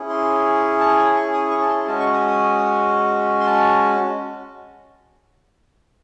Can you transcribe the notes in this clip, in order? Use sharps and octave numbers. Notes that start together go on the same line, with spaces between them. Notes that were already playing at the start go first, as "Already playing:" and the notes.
Already playing: C#4 E4 G#4
C6
A5
G#5
C#6
D#6
C#6
A5
C6
G#3 C#4 F#4 A5
C#6
D#6
D#6
C6
A5